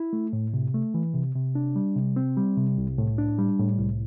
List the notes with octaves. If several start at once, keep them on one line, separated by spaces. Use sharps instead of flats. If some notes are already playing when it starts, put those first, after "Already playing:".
Already playing: E4
A3
A2
C3
A3
E3
C3
C3
D4
G3
C3
C4
G3
C3
C2
A2
D4
G3
A2
C2